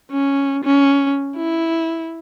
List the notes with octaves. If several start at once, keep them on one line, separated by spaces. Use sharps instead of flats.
C#4
C#4
E4